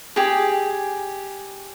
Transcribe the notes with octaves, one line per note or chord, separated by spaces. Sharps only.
G4 G#4